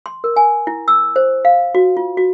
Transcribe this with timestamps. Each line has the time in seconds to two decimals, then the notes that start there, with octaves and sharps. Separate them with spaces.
0.06 C6
0.24 A#4
0.36 G#5
0.67 E4
0.88 E6
1.16 C5
1.45 F5
1.75 F#4
1.97 F4
2.17 F#4